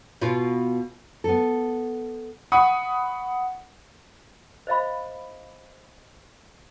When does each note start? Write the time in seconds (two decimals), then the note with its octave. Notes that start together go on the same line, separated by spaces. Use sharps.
0.22 B2 F4
1.24 B3 A4
2.52 F#5 B5 C#6 D#6
4.67 C5 D#5 F5 B5